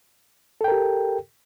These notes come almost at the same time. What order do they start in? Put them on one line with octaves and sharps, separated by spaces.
A4 G5 A#4 G4